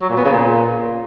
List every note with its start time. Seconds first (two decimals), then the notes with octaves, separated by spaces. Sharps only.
0.01 F#3
0.09 A#2
0.17 B3
0.25 C#3
0.33 A#2